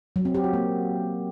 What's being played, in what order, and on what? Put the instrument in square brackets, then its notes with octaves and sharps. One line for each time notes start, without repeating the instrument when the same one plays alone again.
[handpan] F#3
C4
G4
F#4
A#3